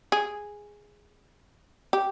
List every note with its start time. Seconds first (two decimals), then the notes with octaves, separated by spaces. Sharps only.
0.12 G#4
1.93 G4